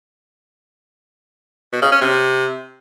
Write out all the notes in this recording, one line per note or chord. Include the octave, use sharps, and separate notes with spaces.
B2
C#3
C#4
C3